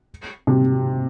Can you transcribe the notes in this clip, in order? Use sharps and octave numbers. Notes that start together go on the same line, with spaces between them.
C3